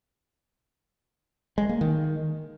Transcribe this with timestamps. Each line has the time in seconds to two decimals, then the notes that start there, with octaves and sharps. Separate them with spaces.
1.58 G#3
1.69 A#3
1.81 D#3